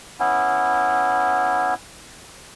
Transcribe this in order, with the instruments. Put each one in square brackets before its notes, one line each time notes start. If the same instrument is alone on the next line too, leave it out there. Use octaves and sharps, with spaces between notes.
[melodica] B3 C#4 E4